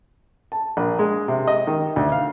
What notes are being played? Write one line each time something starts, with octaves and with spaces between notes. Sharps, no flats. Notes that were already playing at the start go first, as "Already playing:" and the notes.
A5
A#1
G#3
C3
D#5
D#3
D2
F5